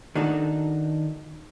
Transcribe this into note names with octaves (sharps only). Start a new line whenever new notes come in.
D#3 D4 D#4 F#4 A4